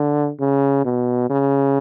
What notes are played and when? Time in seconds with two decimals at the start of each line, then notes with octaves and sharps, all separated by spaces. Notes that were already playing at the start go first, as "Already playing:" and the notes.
Already playing: D3
0.40 C#3
0.85 B2
1.30 C#3